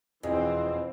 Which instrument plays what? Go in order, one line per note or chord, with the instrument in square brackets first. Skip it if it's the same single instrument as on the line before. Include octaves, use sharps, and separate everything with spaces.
[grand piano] E1 G#4 [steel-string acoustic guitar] F2 [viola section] E3 C4